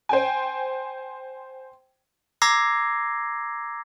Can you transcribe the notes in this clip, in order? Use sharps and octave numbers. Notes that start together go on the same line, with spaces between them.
C5 G5 G#5
A#5 D6 E6 G#6 A#6 C7